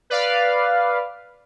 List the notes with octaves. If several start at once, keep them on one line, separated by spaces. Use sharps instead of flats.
B4 D5 F5